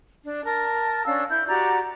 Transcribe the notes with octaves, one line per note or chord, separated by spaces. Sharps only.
D4
A#4 A5
C#4 D4 F5 E6
E4 G6
F#4 G4 D5 A#5